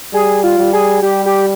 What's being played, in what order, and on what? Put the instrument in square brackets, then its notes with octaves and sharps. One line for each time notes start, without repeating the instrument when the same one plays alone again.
[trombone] G3 [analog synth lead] G#4
[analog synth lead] F4
[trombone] G3
[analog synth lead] G#4
[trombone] G3 [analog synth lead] G4
[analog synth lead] G4